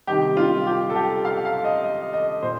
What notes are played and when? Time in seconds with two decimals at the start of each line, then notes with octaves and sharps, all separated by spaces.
0.07 C3 D#3 G3 G4
0.37 F4
0.66 G4
0.90 A4
0.95 G4
1.25 F5
1.45 F5
1.64 D#5
1.84 D#5
2.13 D#5
2.42 A#2 C5